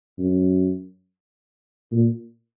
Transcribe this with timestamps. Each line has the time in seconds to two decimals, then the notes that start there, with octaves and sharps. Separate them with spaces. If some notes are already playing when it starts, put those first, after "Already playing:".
0.18 F#2
1.92 A#2